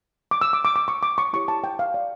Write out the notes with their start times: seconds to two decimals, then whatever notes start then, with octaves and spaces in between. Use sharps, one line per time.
0.31 D6
0.41 E6
0.53 D6
0.65 D6
0.76 D6
0.88 C#6
1.03 D6
1.18 C#6
1.33 E4 G4 C#5 C#6
1.48 A5
1.64 G5
1.79 F5
1.94 D5